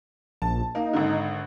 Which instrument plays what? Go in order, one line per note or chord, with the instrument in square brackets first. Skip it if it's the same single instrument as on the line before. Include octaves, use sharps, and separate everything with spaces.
[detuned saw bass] A#1 [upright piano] A5
[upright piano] A#3 [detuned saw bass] D#4
[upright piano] G#1 D3